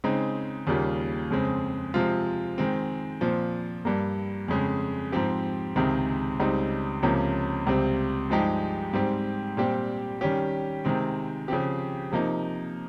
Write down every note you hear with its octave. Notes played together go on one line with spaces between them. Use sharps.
C#3 G#3 C4 D#4
D#2 C#3 G3 A#3 F4
F2 C#3 G#3 C4
C3 F3 G#3 C4 F4
D#3 G#3 C4
A#2 F3 C4
G2 G3 A#3
F2 C#3 G#3
G#2 F3 C4 G4
C#2 C3 D#3 G#3 C4
C#2 C#3 G3 C4 D#4
C#2 C3 F3 A#3 C#4
C#2 C3 G3 C4
G2 F3 G#3 D#4 G4
G#2 G3 C4 G4
A#2 G3 C4 G4
D#3 G3 C#4 G4
C3 D#3 G#3 C4
C#3 F3 C4 G4
C3 F3 A#3 D#4